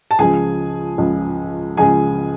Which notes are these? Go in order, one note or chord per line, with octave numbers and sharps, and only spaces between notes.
A5
C#2 C#3 F3 G#4 G#5
C#2 C#3 F3
C#2 C#3 F3 G#4 G#5